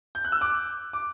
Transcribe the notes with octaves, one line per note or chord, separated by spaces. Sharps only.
G6
F#6
E6
D6 F#6
D6